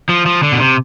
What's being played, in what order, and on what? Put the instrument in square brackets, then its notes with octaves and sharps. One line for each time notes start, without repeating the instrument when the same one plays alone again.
[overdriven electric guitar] F3
F3
D3
B2
C3